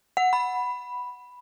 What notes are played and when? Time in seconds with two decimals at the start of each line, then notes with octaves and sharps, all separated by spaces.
0.17 F#5
0.33 B5